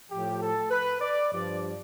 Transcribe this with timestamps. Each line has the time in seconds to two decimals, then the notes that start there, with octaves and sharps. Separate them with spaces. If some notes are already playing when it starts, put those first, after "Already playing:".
0.11 A2 F3 G4
0.42 A4
0.71 B4
1.01 D5
1.32 G2 F3 D5